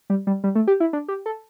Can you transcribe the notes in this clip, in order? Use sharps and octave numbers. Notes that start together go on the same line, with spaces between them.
G3
G3
G3
A3
G4
E4
D4
G4
A4